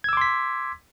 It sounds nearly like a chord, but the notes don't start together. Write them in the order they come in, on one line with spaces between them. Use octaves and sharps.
G#6 E6 D6 C6 B6